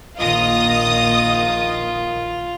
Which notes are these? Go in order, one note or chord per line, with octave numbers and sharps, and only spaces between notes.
A#1 D#3 A#3 F4 D#5 D#6